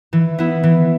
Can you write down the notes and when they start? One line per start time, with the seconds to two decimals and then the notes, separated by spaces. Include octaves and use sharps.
0.13 E3
0.38 B3 E4
0.63 E3